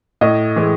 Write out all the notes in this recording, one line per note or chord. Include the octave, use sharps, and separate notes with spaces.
A2 D#5
E3 G#3